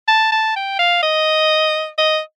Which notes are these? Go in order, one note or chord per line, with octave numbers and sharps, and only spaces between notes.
A5
A5
G5
F5
D#5
D#5